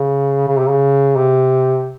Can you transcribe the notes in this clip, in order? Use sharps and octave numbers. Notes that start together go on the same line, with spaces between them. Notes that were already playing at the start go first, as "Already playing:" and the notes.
Already playing: C#3
C#3
C3
C#3
C3